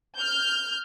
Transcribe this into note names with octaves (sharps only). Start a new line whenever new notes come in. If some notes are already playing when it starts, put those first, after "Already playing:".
F6 G6